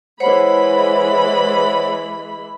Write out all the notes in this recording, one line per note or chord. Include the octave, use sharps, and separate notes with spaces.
E3 G#3 C5 C#5 F#5 B5